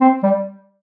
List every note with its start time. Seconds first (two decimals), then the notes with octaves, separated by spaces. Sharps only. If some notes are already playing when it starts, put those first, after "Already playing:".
0.01 C4
0.23 G3